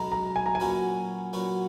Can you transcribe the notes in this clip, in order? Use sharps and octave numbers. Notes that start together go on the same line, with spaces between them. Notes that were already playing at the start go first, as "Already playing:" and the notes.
Already playing: B1 B2 G#3 B3 A#5
A#5
G#5
A#5
G#5
A#2 F#3 C#4 F#4 B4
A#2 F#3 C#4 F#4 B4